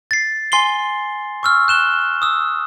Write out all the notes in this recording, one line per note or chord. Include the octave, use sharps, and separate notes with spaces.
A6 C7
G#5 C6 C7 G7
C#6 E6 F6
F#6 E7 G7
D#6 E6